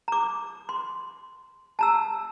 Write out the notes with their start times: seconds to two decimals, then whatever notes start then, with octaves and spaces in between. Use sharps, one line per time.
0.08 A#5 D6
0.69 C6
1.79 A5 A#5 E6